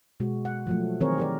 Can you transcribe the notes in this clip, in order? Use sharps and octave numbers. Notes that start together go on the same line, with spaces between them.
B2 G#3 F#4
F#5
F3 F#3 A3
D#3 E3 C4 G#4 A#4 C#5
G4 A#4 D5